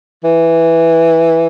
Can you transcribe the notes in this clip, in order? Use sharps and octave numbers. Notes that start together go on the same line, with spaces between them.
E3